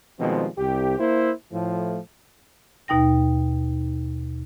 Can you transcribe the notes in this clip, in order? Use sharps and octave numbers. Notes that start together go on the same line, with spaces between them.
B2 D#3 F3 G3 G#3 C4
C2 G4
A#3 E4 C5
A2 F3
D#2 B2 D#4 G5 A#6